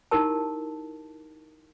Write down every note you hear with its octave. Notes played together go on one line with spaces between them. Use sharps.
D#4 E4 G4 A#4 A5